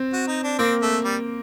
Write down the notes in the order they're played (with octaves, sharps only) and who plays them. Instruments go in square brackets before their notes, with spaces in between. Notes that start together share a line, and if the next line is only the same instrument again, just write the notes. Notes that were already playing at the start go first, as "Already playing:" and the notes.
Already playing: [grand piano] C4
[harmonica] F#4
D#4
D4
[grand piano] A#3 [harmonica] C4
[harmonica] A3
G3